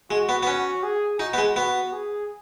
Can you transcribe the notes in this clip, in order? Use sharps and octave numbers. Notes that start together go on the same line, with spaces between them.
G#3 F#4
B3
B3
C#4
G#4
D#4 F#4
B3
G#3
B3 F#4
G#4